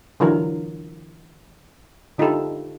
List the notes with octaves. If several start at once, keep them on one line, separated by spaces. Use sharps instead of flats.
D3 E3 F#3 F4 A#4
D3 D#4 F4 G4 A4